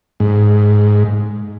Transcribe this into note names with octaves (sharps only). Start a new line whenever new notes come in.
G#2